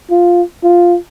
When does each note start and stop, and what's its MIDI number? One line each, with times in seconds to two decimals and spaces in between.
0.10 0.42 65
0.63 0.97 65